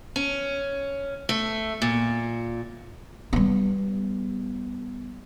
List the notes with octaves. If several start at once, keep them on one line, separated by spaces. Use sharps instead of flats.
C#4
A3
A#2
G3 B3